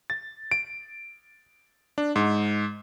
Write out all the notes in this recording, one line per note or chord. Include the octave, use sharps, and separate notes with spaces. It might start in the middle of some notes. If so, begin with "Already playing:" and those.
A6
D7
D4
G#2